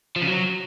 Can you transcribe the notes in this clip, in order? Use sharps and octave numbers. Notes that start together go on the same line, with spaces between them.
F3
C#3
F#3